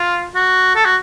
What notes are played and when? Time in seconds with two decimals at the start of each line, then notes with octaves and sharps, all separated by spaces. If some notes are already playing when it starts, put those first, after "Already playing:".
Already playing: F4
0.35 F#4
0.75 A4
0.85 F#4